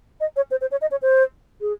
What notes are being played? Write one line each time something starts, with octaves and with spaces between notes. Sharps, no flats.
D#5
C#5
C5
C5
C#5
D#5
C#5
C5
G#4